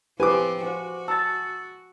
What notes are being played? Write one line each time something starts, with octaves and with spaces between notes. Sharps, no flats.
F3 C4 G4 B4 G#5 D6
F#4 C5
A5 E6 A6